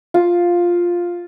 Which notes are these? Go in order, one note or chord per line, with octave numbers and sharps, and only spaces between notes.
F4